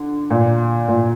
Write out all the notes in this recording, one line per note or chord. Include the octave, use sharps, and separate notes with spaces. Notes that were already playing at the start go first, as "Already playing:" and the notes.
Already playing: D3
A#2
A#2